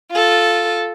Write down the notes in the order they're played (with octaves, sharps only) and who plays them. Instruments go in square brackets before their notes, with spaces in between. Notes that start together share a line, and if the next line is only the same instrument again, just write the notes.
[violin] F4 A4